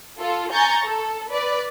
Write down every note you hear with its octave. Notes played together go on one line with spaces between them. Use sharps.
F4 A4
G#5 A#5 C#6 G6 A6
A4
B4 D5